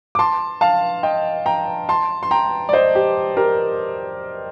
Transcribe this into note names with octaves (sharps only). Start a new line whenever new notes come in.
D6
A5 C6
F5 A5
D#5 G5
G5 A#5
A5 C6
C6
G5 A#5
D5
C5 D#5
G4
G4 A#4